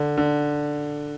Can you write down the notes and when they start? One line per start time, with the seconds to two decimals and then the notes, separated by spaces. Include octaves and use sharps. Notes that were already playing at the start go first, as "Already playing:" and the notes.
Already playing: D3
0.17 D3